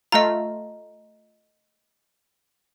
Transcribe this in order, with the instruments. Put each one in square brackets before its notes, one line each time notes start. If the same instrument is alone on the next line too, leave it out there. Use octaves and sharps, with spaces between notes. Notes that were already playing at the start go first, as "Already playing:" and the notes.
[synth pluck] A3 F4 [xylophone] D#5 A#5